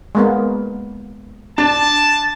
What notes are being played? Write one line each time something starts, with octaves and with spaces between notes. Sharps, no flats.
G#3 A#3 B3
D4 A5